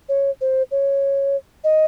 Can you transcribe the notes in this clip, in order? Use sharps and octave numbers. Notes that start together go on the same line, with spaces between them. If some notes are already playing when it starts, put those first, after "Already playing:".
C#5
C5
C#5
D#5